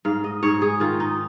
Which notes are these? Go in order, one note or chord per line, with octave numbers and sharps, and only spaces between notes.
G#2 F5
D#5
G#2 C#5
G#4
D#3 F4
D#4